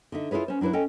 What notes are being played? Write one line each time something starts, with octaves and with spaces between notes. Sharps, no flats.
D3 D#4 E5
E4 F4 G#4 B4 C#5
C#4 C5
F#3 D4 E4 B4 C5
C#4 A4 D#5 G5